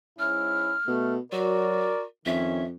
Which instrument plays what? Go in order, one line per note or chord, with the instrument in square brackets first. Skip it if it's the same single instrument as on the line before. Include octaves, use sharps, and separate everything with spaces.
[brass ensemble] G#2 C#4 E4 [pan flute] F6
[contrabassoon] B2 [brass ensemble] A3
[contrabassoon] F#3 [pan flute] F#4 [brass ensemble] A#4 D5
[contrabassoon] F2 [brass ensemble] D#3 C#4 [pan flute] E5